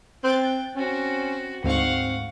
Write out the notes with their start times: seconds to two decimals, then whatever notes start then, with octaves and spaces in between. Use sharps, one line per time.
0.24 C4 G5 F#6 A6
0.76 C4 C#4 F#4
1.64 D2 G#2 C4 F5 F#5 C#6